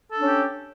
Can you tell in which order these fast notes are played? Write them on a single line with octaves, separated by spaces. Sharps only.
A4 D4 C#4 G4